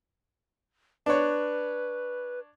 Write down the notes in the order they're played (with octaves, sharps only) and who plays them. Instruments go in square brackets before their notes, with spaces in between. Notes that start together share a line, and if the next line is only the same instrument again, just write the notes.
[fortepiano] D4 C#5 [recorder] B4